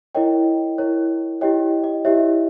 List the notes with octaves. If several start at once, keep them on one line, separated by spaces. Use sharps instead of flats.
E4 A#4 C#5 D#5 G5
E4 A#4 C#5
E4 G4 C#5 D#5 G5
D#5
E4 G4 C#5 E5